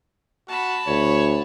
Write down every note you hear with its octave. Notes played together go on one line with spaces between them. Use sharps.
F#4 A5 B5
D2 C#5